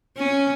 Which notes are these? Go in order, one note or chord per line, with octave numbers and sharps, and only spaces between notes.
C#4